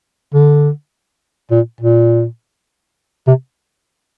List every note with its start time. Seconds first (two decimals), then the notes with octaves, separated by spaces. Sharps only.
0.34 D3
1.51 A#2
1.81 A#2
3.27 C3